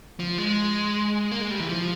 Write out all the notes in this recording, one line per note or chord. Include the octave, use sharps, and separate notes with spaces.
F3
G#3
A#3
G#3
G3
E3
F3